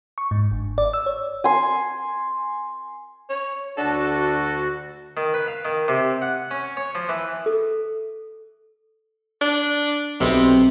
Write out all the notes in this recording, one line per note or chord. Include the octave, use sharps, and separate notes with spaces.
C#6
G#2
G1
D5
E6
C#5
G#5 C6
C#5
D2 D4 F#4 A4
D#3
B4
F5
D#3
C3
F#5
C#4
C#5
F3
E3
A4
D4
B1 C3 B3 C4